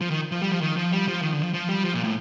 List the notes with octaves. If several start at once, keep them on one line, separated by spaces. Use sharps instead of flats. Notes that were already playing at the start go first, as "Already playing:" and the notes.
F3
D#3
F3
G3
F3
D#3
F3
G3
F3
D#3
D3
F3
F3
G3
F3
A#2
A2